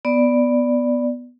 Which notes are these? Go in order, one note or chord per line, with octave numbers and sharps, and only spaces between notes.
B3 D5